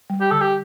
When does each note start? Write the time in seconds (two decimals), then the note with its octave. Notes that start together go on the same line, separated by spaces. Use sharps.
0.10 G3
0.21 G4
0.31 D3 A4
0.40 G4